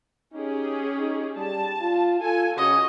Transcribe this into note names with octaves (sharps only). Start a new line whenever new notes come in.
C#4 D#4 G4 G#4
D#4
G3 A5
F4
F4 A4 G#5
C#3 F#4 C#5 D#5